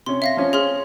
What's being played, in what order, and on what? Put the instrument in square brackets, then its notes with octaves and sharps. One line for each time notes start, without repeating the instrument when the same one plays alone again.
[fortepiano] C3 C#4 [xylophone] C6
[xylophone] E5 F5 A#6
[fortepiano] F3 C#4
[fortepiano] C#4 [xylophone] G#4 C6 F6